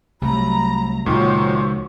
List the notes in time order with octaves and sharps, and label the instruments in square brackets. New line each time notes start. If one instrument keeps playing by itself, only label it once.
[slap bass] C2 C3 A3 [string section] F#3 A#5 [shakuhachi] B5
[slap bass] C#2 [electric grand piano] A#2 D#3 F4 [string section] F3 F#4 C#5 [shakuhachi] C#6